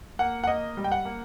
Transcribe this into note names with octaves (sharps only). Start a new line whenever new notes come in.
A#3 F#5
F#5
A#3 D#5
G3
G5
F#5
A#3